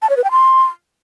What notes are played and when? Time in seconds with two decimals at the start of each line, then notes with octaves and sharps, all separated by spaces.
0.02 A5
0.10 C#5
0.17 B4
0.24 G5
0.31 C6